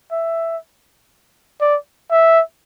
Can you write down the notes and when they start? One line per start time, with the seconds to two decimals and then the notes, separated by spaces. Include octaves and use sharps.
0.11 E5
1.61 D5
2.11 E5